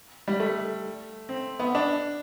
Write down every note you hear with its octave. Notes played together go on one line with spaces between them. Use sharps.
G3
A3
C4
B3
D4